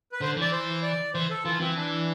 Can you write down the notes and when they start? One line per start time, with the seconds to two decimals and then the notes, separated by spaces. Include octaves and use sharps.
0.12 B4
0.21 D3 C5
0.37 E3 D5
0.52 C5
0.83 D5
1.14 E3 C5
1.30 A4
1.45 E3 F4
1.60 E3 C4
1.76 D4